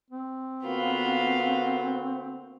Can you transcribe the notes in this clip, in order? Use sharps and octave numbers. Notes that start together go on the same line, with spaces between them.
C4
D3 A#3 B3 F4 F#4